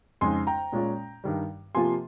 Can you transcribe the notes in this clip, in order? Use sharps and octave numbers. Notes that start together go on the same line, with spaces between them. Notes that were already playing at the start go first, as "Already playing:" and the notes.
F2 C#3 G#3 D#4 G#5 C6
G5 A#5
A#2 G#3 C#4 F4
G2 D#3 G3
C3 F3 A#3 F4 G#5 C6